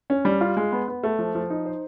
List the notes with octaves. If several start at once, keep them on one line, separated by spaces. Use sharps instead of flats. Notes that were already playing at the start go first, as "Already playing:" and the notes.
C#4
G3
F4
G#3
B3
B3
A3
F3
F3
D#4
C5